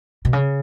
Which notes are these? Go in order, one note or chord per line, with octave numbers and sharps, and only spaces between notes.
B2
C#3